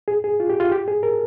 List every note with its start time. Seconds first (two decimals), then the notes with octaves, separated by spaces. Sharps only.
0.08 G#4
0.24 G#4
0.40 F4
0.50 G4
0.60 F4
0.72 G4
0.88 G#4
1.03 A#4